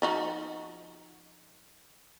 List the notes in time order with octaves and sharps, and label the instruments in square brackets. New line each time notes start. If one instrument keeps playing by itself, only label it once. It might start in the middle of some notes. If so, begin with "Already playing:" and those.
[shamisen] F3 D#4 F#4